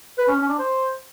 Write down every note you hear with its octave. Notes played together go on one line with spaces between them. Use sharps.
B4
C#4
C#4
D4
C5